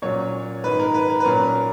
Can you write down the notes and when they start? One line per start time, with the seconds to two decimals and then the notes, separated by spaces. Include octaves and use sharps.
0.02 A#2 F#3 C#4 C#5
0.64 G#2 D#3 G#3 B4
0.79 A#4
0.94 B4
1.10 A#4
1.20 B4
1.25 A#2 F#3 A#3 C#4 A#4